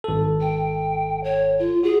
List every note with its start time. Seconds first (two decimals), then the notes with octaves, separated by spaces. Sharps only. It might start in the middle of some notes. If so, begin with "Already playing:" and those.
0.04 G#1 A4
0.41 G5
1.24 C#5
1.59 F4
1.83 F#4 G#4